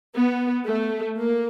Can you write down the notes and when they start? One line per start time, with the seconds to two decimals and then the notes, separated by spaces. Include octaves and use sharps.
0.15 B3
0.67 A3
1.19 A#3